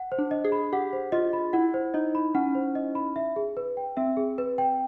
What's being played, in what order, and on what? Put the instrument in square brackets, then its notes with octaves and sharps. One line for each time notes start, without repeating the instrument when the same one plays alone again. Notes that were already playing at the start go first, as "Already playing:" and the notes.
Already playing: [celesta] F#5
C5
[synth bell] D4
[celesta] D#5
[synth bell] G#4
[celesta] B5
[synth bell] G4 [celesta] F#5
[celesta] C5
[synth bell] F4 [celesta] D#5
[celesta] B5
[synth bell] E4 [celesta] F#5
[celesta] C5
[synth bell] D#4 [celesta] D#5
[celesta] B5
[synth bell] C#4 [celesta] F#5
[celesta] C5
D#5
B5
E5
G#4
B4
G5
[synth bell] C4 [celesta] E5
[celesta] G#4
B4
G5